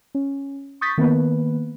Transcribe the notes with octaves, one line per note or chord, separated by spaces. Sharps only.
C#4
C#6 D#6 G6 A6 B6
D#3 A#3 B3 B4